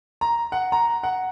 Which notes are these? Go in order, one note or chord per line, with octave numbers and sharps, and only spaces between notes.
A#5
F#5
A#5
F#5